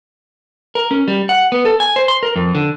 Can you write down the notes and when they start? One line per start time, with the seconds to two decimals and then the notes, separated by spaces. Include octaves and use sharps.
0.75 A#4
0.91 C#4
1.08 G3
1.29 F#5
1.52 B3
1.65 A4
1.80 G#5
1.96 C5
2.08 C6
2.23 A#4
2.36 F2
2.55 D3